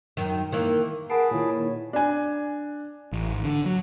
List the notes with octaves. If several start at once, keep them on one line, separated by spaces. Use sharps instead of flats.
F#2 D#3
D#3 E3 A#3
G#4 A#4 B4 F#5 A5 C7 D7
A#2 D#3 E4 C#5
D4 G#5
A1
G#1
D3
F#3